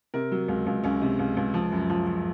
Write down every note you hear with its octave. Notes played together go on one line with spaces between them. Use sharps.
C3 A#4
F#3
C#2
C#2
C#2 C#4
C3
C#2
C#2
F3
F#2
F3
F3